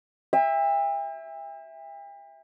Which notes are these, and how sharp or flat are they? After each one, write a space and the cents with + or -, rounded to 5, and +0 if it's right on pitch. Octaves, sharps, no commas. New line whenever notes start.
E5 +0 G5 +45